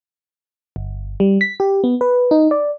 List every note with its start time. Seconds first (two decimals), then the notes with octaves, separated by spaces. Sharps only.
0.76 G1
1.20 G3
1.41 B6
1.60 G4
1.84 B3
2.01 B4
2.31 D#4
2.51 D5